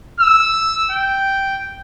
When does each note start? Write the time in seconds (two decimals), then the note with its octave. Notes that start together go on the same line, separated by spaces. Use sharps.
0.20 E6
0.91 G5